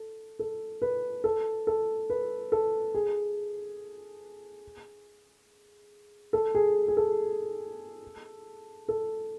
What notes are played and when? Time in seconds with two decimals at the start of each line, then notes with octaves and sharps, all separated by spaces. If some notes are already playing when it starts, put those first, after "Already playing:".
Already playing: A4
0.39 A4
0.82 B4
1.24 A4
1.67 A4
2.10 B4
2.52 A4
2.94 G#4
6.33 A4
6.55 G#4
6.88 G#4
6.97 A4
8.88 A4